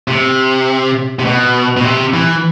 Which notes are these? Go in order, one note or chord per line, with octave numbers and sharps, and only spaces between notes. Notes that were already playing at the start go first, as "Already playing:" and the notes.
C3
C3
B2
B2
C3
E3